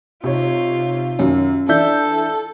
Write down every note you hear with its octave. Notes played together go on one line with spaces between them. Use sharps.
C3 D#4 F4 C#5
F#2 D#3 C#4
E3 D4 A4 E5 G6